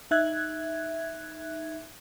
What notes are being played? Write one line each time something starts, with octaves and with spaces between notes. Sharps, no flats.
D#4 E5 F#6 G#6